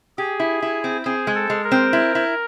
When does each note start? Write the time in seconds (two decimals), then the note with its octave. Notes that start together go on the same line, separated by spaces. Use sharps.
0.18 G4 G#4
0.40 E4
0.62 E4
0.84 C4
1.05 C4 G#4
1.27 G#3
1.35 A4
1.50 G#3
1.64 A#4
1.72 C4
1.93 E4
2.15 E4